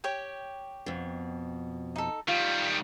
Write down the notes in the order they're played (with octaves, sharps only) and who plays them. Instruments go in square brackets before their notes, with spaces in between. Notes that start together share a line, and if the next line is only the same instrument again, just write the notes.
[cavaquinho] G4 C#5 G5
[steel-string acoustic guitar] F2 B2
[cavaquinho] D#4 A4
[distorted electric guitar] D#3 G3 [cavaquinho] F4